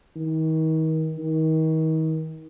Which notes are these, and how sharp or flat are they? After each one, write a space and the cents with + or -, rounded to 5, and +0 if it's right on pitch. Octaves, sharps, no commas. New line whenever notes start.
D#3 +35
D#3 +35